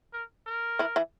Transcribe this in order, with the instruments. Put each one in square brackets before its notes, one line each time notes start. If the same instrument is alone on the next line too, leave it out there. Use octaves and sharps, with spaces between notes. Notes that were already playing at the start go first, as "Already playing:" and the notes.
[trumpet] A#4
A#4
[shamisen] E3 E4
E3 E4